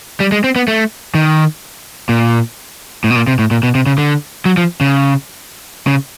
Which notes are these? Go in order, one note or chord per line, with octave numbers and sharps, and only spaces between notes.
G3
G#3
C4
B3
A3
D#3
A#2
A2
B2
A#2
C3
A2
A#2
B2
C3
C#3
D3
F#3
F3
C#3
C#3